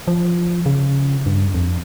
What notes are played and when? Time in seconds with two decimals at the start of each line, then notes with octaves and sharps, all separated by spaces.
0.08 F3
0.66 C#3
1.26 G2
1.54 F2